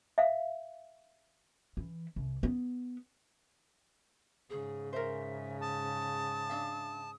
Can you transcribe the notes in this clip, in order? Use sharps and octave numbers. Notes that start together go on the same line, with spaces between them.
E5 F5
E3
C2
B3
G#2 C#3 G#4
A#4 C5 E5
A5 D#6
D4 E5 F5